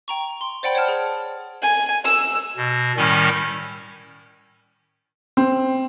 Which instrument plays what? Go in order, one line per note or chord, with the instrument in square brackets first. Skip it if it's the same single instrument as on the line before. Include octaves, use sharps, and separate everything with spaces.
[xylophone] G5 A#5 C#6
C6
C5 D5 F#5 G5 B5
C#5 D5 F#5 G5 A5 F6
G#4
[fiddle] G#5
E6
[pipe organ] B2
A2 D#3 G3 C#4
[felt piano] C4